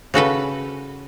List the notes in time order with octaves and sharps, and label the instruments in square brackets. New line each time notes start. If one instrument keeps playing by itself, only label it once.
[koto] C#3 F#4 A4 B4